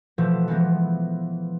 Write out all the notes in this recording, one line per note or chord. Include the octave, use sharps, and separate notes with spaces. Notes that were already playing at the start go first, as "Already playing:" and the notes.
B2 E3 F3 A3
E3 F3 G#3 B3